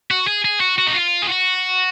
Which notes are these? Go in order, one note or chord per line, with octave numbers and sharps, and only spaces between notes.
F#4
G#4
G#4
F#4
F#4
D#4
F4
G#4
F#4